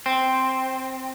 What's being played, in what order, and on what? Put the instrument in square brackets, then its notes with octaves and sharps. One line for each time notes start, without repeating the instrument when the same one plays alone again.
[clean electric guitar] C4